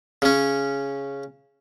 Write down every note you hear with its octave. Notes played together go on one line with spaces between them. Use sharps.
C#3 C#4